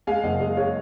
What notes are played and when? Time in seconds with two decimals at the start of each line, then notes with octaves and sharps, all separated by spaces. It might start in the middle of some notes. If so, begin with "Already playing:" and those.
0.07 G#3 F5 G#5
0.23 F#1 D#5 F#5
0.40 G#3 D#5
0.57 G#3 C#5 F5